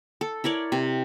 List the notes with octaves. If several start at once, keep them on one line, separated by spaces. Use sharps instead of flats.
A4
E4 A#4 C#5 D5
C3